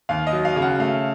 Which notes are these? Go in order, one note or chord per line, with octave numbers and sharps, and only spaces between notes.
D#2 F5
D#5
F#3
F5
C#3
F#5
A3 F5